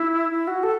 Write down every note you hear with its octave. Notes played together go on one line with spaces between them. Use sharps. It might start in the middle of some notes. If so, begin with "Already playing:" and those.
Already playing: E4
E4
F#4
A4